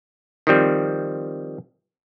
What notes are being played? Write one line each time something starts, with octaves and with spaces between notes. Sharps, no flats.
D#3 F3 G3 C4